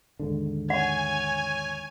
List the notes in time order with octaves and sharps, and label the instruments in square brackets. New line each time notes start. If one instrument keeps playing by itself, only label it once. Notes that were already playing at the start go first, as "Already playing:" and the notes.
[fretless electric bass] D#2 G#2 D3
[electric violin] C#5 [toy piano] F#5 [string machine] G#5